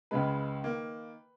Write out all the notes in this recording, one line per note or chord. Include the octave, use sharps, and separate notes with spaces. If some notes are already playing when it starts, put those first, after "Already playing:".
C#2 C#3 G#3 B4
D#3 A#3